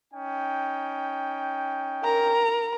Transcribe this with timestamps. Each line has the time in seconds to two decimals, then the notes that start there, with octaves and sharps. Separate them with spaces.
0.13 C#4 D#4 G5
2.04 A#4 A#5